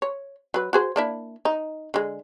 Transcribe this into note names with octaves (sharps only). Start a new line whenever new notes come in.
C#5
F#3 B4
F#4 G#4 C5
A#3 D4 E4
D#4
D3 G#3